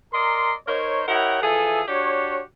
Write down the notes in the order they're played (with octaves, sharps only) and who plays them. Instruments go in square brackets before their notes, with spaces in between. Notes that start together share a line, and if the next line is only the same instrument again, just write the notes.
[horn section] A#4 D5 D#5 A#5 C6
D#4 A#4 C5 C#5
E4 G4 A#4 C#5 D#5 F#5
E3 F3 G#4 A4 E5 G#5
D4 F#4 G4 C#5